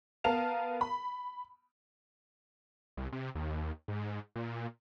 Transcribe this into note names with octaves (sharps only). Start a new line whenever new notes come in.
B3 A#4 F5 A5 F7
B5
C2
C3
D#2
G#2
A#2